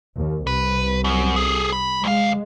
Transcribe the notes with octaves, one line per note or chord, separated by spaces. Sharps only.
D#2
C2 B4
F#2
G#4 A4
B5
D2 G#3 F5